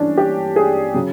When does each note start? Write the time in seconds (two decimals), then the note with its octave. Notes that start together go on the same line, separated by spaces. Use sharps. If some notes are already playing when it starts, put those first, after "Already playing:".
Already playing: G2 E3 C#4 D4
0.17 G4
0.56 G#4
0.94 C#3 F#3